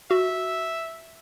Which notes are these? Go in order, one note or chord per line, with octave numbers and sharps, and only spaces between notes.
F#4 E5